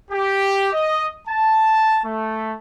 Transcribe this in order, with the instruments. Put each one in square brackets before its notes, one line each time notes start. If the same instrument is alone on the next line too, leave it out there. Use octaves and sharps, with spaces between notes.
[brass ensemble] G4
D#5
A5
A3